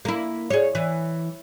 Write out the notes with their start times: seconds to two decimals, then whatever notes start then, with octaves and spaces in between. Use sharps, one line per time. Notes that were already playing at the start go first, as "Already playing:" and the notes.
0.05 A#3 E4
0.50 G#4 C#5
0.75 E3